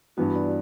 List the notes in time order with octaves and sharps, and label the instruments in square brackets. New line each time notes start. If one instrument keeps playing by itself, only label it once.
[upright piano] G2 E3 B3 [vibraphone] F#4
[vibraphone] D5